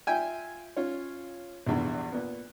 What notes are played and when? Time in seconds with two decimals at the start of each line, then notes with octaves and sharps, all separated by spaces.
0.07 F4 E5 G5 G#5
0.77 C#4 F4 C#5
1.67 A#1 E2 G2
2.12 A#2 B3